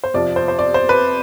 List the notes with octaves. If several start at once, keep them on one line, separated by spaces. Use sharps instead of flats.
C5
F2 C3 F3 D5
C5
C5
D5
C5
B4